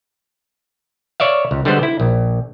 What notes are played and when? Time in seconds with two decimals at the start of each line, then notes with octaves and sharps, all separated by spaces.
1.20 C#5 D5 E5 F5
1.51 C#2
1.65 D3 G3 G#3 B3 C5
1.83 E4
2.00 A#1